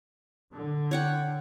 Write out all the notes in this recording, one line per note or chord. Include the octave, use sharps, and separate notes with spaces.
D3
C#5 F#5 G5